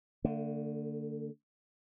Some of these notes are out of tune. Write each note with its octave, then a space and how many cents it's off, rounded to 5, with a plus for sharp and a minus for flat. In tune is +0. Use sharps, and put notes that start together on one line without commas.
D3 +0 A3 +45